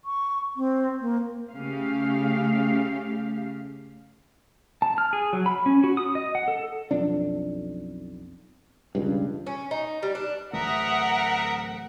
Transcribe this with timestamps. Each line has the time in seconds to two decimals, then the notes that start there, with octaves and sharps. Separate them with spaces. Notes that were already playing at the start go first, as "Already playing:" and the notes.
0.05 C#6
0.56 C4
1.01 A#3
1.54 C#3 A3 G4 F5
4.82 A5
4.98 F6
5.13 G#4
5.33 F#3
5.46 B5
5.66 C#4
5.84 F#4
5.97 D#6
6.15 D#5
6.35 F#5
6.48 A4
6.91 B1 F2 D4
8.95 E1 C#2 G2
9.47 C#4
9.71 D#4
10.03 G3
10.15 D4
10.53 D1 E3 A3 A#4 E5 F#5 D#6